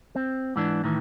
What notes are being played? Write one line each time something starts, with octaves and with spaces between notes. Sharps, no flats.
C4
G#2 E3 D4
A2 D#3 E3